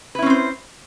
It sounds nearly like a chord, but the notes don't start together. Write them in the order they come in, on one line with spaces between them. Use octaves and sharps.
B4 E4 C#4 C4 C5